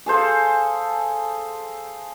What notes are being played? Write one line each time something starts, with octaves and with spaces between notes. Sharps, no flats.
G#4 A4 C5 F5